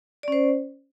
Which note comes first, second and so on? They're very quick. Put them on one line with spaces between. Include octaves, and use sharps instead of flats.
D5 C#4 C5